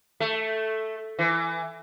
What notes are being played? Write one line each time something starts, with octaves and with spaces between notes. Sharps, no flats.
A3
E3